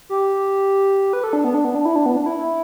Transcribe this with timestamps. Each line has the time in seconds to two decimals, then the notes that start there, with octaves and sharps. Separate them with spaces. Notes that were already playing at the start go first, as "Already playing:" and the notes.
0.09 G4
1.13 B4
1.24 A4
1.33 D4
1.44 B3
1.54 D4
1.65 B3
1.75 D4
1.85 E4
1.96 D4
2.06 B3
2.17 D4
2.26 E4
2.37 E4